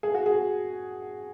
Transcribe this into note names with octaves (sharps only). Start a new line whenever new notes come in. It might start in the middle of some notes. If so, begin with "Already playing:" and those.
G#4
F#4
G#4